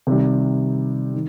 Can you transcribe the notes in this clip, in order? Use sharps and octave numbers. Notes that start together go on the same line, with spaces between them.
C3 D#3 G3
D#3